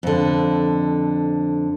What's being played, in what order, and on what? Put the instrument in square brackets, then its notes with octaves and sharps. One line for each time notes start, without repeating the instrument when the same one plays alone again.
[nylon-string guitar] F2 D3